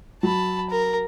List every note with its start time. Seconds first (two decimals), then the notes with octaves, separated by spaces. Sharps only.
0.23 F#3 A5 B5
0.70 A#4